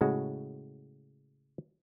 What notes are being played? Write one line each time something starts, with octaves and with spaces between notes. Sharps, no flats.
A2 C#3 G#3 F#4